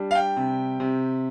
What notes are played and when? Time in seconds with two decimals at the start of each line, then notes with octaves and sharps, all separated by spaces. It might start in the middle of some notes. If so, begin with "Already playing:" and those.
Already playing: G3 D4
0.11 F5
0.15 G5
0.37 C3
0.80 C3